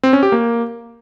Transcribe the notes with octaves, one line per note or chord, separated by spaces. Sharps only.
C4
C#4
G4
A#3